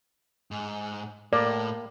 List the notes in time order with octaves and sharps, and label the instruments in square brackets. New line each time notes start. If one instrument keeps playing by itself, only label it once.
[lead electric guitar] G#2
[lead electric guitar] A2 [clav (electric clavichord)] A#3 [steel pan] D5